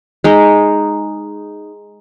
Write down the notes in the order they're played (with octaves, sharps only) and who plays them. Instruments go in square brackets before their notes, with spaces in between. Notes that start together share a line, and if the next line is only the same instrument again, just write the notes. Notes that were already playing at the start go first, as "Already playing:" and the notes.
[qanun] G#3 D#4